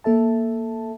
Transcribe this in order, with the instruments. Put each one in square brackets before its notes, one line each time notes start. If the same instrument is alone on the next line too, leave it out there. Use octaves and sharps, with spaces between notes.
[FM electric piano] A#3 A4 E5 A5